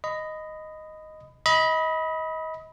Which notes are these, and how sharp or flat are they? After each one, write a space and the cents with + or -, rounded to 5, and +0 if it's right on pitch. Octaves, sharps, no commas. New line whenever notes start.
D#5 +0 B5 +20
D#5 +30 B5 -10